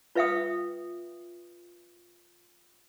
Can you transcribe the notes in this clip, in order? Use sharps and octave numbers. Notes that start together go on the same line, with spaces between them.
F4 B4 E5 F5 G5 D#6